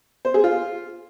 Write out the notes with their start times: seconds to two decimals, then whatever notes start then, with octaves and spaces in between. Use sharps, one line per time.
0.25 C5
0.34 G#4
0.44 F4